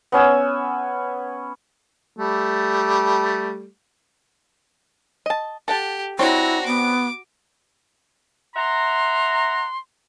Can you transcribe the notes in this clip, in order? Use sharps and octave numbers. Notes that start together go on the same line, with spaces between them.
B3 C#4 G#5 E6
G3 A3
D#5 A5
G4 A4 F#5 A5
C4 D4 E4 F#4 C#5 A#5
B3 D6
E5 F#5 A#5 C6